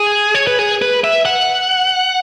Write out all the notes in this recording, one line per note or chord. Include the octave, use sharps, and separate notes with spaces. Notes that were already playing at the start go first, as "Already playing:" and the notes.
Already playing: G#4
C#5
B4
G#4
B4
E5
F#5